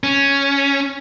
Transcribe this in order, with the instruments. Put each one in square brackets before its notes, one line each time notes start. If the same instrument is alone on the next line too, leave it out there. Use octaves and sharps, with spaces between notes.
[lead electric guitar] C#4